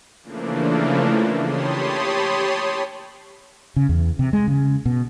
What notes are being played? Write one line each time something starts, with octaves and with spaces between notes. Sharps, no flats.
C#3 E3 F3 A3 A#3 D4
G4 C#5 A5 B5 C6 D#6
C#3
E2
C3
G#3
C#3
B2